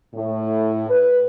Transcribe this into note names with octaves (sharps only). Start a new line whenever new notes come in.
A2
B4